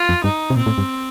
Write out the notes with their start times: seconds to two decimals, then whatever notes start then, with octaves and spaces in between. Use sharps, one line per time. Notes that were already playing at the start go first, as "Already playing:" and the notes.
Already playing: F4
0.09 F2
0.24 G2 D#4
0.50 C3
0.56 A#2 C4
0.66 A2
0.78 G2